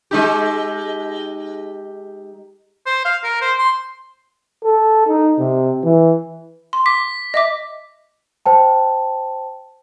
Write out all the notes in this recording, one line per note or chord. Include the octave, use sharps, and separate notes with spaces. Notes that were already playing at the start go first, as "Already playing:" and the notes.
G#3 D#4 G4
C5
F5
A#4
C5
C6
A4
D#4
C3
E3
C6
D6 B6
D#5 E5 D6
C5 G5 A5